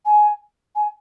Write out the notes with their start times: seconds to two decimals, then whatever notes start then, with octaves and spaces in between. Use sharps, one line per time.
0.05 G#5
0.75 G#5